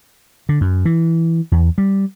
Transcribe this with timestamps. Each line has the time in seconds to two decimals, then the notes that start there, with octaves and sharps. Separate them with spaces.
0.49 D3
0.61 F#2
0.85 E3
1.52 E2
1.78 G3